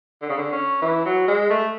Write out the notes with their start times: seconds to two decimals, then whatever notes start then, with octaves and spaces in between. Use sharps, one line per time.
0.22 D3
0.30 C#3
0.38 D3
0.52 C#4
0.82 E3
1.05 F#3
1.28 G#3
1.50 A3